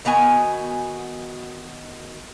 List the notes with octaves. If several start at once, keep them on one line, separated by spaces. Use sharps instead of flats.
D#3 B3 F#4 G#5